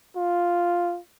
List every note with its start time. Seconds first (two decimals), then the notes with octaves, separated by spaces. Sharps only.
0.16 F4